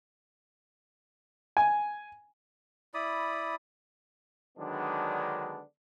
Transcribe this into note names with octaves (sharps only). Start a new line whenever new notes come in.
G#5
E4 D5 B5 D#6
D3 D#3 F#3 G#3 B3 D4